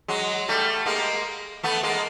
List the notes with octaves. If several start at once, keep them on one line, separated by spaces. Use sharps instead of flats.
F#3 G#3
G3 A3
G#3 A#3
A3 B3
G#3 A#3